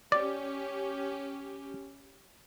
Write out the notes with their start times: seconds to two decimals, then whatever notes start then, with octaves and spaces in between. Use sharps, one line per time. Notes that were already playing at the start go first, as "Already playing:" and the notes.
0.12 C#4 G4 D5